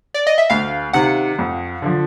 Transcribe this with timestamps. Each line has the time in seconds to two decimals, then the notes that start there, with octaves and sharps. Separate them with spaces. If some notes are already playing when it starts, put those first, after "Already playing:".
0.14 D5
0.27 D#5
0.38 E5
0.50 D2 F5
0.93 C3 D#3 F#5
1.39 F2
1.82 D3 F3